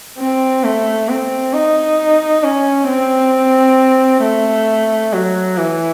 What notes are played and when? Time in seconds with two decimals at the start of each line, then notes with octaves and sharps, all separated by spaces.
0.18 C4
0.64 A3
1.09 C4
1.53 D#4
2.44 C#4
2.88 C4
4.23 A3
5.13 F#3
5.58 E3